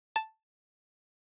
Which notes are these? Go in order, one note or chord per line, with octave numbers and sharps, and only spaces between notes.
A5